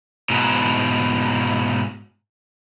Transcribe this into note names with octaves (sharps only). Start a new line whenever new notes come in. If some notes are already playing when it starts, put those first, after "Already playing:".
G#2 B2